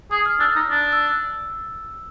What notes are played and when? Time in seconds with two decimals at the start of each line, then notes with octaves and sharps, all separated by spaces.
0.11 G#4 D#6
0.26 F6
0.40 D4 E6
0.56 D#4
0.71 D4
0.92 E6